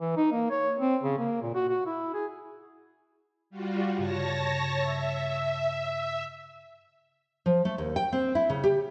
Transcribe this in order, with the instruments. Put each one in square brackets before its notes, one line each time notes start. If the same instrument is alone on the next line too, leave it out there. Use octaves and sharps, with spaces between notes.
[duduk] E3
D#4
A#3
C#5
C4
C#3
A#3
A#2
F#4
F#4
E4
G#4
[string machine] G3 F4 F#4
[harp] G2 C#3 [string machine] C#5 A5 A#6
[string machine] E5
[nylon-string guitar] F3
A3
D#2
G5
C4
E4
C#3
G4